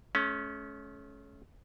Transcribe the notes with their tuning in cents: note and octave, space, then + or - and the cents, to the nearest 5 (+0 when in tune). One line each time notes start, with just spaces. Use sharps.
A3 -45 C#4 +0